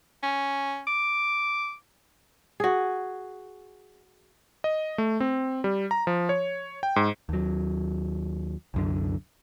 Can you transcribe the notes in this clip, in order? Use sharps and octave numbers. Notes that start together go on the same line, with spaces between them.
C#4
D6
F#4 G#4
D#5
A3
C4
G3
A#5
F3
C#5
G5
G#2
D#2 F#3
C2 F#2 D3